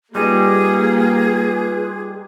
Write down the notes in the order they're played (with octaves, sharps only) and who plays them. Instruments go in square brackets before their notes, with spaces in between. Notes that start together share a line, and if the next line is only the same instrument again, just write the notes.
[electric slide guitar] G3 D#4 [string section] A#3 [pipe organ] F4 B4 [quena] G#4